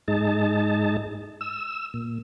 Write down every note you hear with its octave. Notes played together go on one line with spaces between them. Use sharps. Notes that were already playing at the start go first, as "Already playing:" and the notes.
G#2 G#3 D#4 A5
E6
A#2